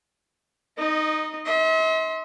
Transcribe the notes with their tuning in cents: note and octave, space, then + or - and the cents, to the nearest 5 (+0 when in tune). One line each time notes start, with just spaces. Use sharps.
D#4 +0 D#5 -20
E5 -45 C6 +5